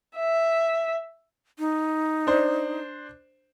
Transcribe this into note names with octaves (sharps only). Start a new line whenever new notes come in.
E5
D#4
D4 C5